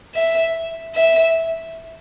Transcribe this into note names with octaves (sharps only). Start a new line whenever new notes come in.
E5
E5